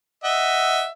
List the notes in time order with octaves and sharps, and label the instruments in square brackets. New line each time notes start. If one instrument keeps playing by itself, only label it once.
[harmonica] D#5 E5 [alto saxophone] F#5